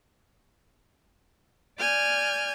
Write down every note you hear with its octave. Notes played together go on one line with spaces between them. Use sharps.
D5 G#5 F6 G6